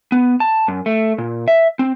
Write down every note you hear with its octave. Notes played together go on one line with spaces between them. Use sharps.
B3
A5
F#2
A3
A#2
E5
C4